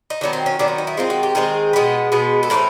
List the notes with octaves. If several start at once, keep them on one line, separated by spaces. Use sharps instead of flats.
D#4
D#3 F#3 B3 D4
C4
C#4
D#3 F#3 B3 D4
C4
D#4
E4
D#3 G#3 C4 F4
F#4
G4
D#3 G#3 C4 G#4
B2 G#3 B3
B2 G#3 B3
A4
A2 E3 A3 C4 A#4